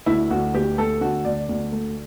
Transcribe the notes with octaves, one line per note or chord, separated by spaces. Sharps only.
D2 E4
D2 F#4
D2 G4
A3 A4
D3 F#4
D2 D5
D2
A3